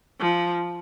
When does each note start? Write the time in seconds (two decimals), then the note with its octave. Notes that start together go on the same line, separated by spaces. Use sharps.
0.20 F3